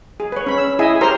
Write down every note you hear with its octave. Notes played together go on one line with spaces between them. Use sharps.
G#4
B4 C#5
C#4 B5
E6
E4 G#4 D#5 E5 G#5
G4 A#4 C5 C#5 A#5 C6